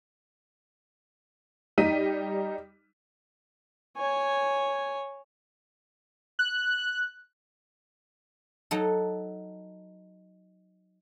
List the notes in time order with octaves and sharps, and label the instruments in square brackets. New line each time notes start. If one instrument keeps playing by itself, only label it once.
[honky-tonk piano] G3 D#4 B6 D#7
[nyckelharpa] C#5 G#5
[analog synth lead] F#6
[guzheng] F#3 D#4 A4